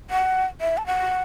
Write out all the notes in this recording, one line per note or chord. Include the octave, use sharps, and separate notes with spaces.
F#5
E5
A5
F#5